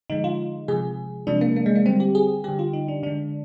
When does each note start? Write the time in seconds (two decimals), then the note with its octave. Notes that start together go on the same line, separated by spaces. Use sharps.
0.10 D3 F3 G#3 D#4
0.24 F4
0.68 C3 F3 G#3 G#4
1.27 C3 F3 G#3 D4
1.41 A#3
1.56 A#3
1.66 G#3
1.76 A#3
1.86 D3 G3 C4
2.00 G4
2.15 G#4
2.44 D3 G3 G4
2.59 F4
2.73 D#4
2.88 D4
3.03 D3 G#3 D4